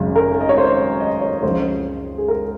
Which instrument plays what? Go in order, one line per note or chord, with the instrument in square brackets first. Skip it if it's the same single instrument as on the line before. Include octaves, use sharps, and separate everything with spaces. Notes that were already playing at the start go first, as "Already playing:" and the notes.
Already playing: [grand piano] G#1 F#2 C#3
A#4
D#5
C#5
C5
D#5
C#5
C#2 C#3 F3 C5
G#4
A#4